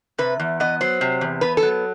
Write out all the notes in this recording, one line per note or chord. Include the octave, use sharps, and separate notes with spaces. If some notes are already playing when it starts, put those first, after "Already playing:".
C3 B4
E2
B3 D#5
F#3 C5
C3
E2
B3 B4
A4
F#3